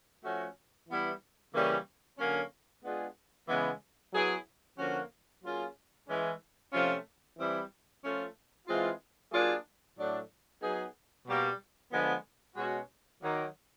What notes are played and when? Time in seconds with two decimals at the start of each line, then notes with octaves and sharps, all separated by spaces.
0.24 F3 A3 C#4 F#4
0.88 E3 G3 B3 E4
1.53 C#3 E3 G3 A#3 C#4
2.19 D3 F#3 A#3 C#4
2.84 G#3 B3 D4 F4 G#4
3.48 C#3 E3 G#3 B3
4.13 F#3 B3 E4 G#4
4.78 D3 F3 A#3 C#4 F#4
5.42 F#3 A#3 C#4 F4 G#4
6.08 E3 G#3 C#4
6.73 C3 F3 A3 C#4 F4
7.37 E3 G3 C4 E4
8.02 F3 A3 C#4 F4
8.67 E3 G#3 C4 F4
9.32 F#3 A#3 D4 F4 G#4
9.97 A2 F#3 A3 D4
10.62 F#3 B3 D#4 G#4
11.27 B2 G3 A#3
11.92 D3 F3 G#3 B3
12.56 B2 G#3 C#4 F#4
13.22 D#3 F#3 A#3